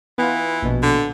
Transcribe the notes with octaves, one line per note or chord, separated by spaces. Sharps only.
E3 B3 F4
A#1 B2
D3